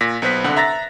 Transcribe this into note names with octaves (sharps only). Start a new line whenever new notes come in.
A#2 A#6 B6
B1 B3 B4 C5 F#6 B6
C2 D3 F#5
E5 A#5 A6 A#6